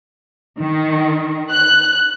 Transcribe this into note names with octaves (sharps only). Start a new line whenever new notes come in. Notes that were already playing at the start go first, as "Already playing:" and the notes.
D#3
F#6